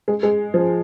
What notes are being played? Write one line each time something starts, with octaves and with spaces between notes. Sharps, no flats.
G#3
G#3
F3